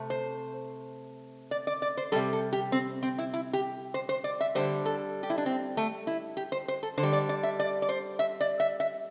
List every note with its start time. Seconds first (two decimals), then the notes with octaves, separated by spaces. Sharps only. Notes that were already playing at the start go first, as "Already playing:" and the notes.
Already playing: C3 A3
0.10 C5
1.51 D5
1.67 D5
1.82 D5
1.97 C5
2.12 C3 G3 A4
2.33 A4
2.53 G4
2.72 C4
3.03 C4
3.18 E4
3.34 E4
3.53 G4
3.94 C5
4.09 C5
4.24 D5
4.41 E5
4.55 D3 G3 C5
4.85 A4
5.23 G4
5.30 E4
5.38 D4
5.46 C4
5.77 A3
6.07 E4
6.37 G4
6.52 C5
6.68 C5
6.83 A4
6.98 D3 C5
7.03 G3
7.13 D5
7.29 D5
7.43 E5
7.60 D5
7.82 D5
7.89 C5
8.19 E5
8.41 D5
8.60 E5
8.80 E5